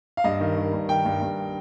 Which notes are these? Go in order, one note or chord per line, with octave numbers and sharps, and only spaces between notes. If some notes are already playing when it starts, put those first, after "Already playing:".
F5
G2 D#5
D#3
D#3
G2
D#3 G5
G2
G2